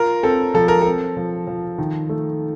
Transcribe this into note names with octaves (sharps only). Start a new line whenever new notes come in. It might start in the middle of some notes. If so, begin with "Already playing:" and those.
Already playing: F4 A#4
C4 A4
F3 A4
A#4
C4 A4
F3
F3
D#3
A3